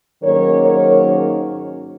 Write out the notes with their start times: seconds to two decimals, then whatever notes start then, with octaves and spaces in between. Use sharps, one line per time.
0.22 G#2 D#3 F#3 A#3 C#4 A#4 C#5
0.62 A#4 C#5